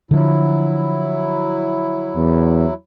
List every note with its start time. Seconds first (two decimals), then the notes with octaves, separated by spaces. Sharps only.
0.11 D3 F3 F#3 E4
2.16 E2